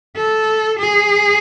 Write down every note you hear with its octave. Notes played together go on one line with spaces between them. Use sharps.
A4
G#4